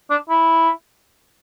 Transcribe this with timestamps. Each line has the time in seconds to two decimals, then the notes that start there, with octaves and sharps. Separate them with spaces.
0.10 D4
0.29 E4